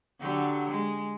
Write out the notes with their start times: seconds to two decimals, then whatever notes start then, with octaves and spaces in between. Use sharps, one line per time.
0.20 D3 F#3 G4
0.69 G#3